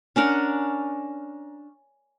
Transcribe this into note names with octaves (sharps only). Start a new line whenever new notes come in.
C#4 D4 A#4 F#5